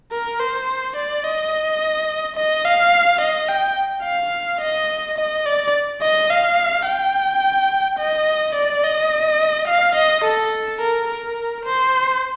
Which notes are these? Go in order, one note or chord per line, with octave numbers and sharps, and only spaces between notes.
A#4
C5
D5
D#5
D#5
F5
D#5
G5
F5
D#5
D#5
D5
D#5
F5
G5
D#5
D5
D#5
F5
D#5
A4
A#4
A#4
C5